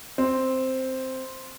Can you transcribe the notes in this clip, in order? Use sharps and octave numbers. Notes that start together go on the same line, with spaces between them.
C4